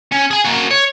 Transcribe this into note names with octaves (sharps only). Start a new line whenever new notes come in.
C#4
G#4 G#5
A#3 F#4
C#5